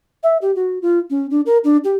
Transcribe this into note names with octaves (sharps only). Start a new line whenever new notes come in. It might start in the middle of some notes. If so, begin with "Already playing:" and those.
E5
G4
F#4
F4
C#4
D4
A#4
D4
G4